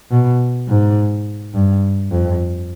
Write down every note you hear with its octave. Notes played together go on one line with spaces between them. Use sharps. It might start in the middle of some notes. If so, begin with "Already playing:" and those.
B2
G#2
G2
F2